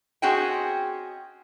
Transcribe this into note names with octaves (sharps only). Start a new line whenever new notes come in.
C4 C#4 F#4 G#4 D#5 G5